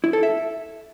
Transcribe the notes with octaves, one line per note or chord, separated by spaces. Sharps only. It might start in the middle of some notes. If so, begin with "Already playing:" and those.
E4
A4
E5